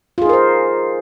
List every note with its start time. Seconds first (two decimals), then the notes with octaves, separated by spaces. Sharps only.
0.18 F4
0.22 G#4
0.25 D#4
0.29 A#4
0.33 C5